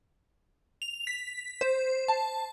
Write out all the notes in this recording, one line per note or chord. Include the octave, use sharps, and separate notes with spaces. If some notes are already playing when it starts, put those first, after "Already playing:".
F7
B6
C5
A5